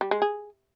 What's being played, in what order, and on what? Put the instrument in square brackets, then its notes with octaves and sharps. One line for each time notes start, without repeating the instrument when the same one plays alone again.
[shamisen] G3
G#3
G#4